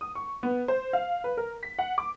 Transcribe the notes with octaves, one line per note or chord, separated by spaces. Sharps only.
D#6
C#6
B3
C5
F5
B4
A#4
B6
F#5
D6